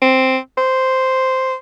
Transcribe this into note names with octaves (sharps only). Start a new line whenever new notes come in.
C4
C5